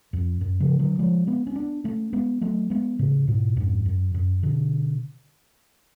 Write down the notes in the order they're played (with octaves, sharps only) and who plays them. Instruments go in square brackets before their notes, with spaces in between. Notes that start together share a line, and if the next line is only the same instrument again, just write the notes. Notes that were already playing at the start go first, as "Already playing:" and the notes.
[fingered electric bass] F2
F#2
C#3 F3
D3 F#3
F3 G#3
G#3 B3
C#4
B3 D4
A3 C#4
G#3 B3
F#3 A3
G#3 B3
A2 C#3
G#2 B2
F2 G#2
F#2
F#2
B2 D3